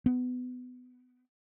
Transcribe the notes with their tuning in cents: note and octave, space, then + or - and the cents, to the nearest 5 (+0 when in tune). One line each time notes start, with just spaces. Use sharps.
B3 +20